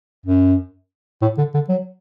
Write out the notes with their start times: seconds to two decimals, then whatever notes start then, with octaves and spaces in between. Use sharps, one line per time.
0.26 F#2
1.22 A2
1.38 D3
1.54 D3
1.69 F#3